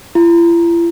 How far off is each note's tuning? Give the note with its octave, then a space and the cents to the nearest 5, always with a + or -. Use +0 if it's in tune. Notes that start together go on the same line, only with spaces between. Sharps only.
E4 +45